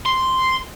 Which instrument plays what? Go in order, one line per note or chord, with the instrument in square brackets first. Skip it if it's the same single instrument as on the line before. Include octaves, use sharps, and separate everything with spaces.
[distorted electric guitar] C6